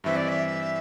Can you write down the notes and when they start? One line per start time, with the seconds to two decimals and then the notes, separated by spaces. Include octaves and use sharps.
0.04 G2 E3 C4 E5
0.16 D5
0.29 E5